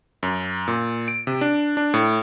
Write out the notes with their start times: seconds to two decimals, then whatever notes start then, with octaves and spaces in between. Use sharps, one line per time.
0.23 F#2
0.68 A#2
1.08 D7
1.27 C3
1.41 D4
1.77 D4
1.94 A2